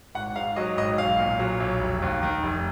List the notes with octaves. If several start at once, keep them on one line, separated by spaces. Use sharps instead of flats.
G#1 F#5
G#2 F5
F#3 D#5
G#1 D#5
B1 F5
A#2
F#3
B1
F1
D#2
D#3
F1